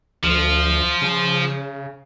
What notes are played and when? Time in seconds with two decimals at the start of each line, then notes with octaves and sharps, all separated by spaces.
0.24 D2 F3 F4
1.02 C#3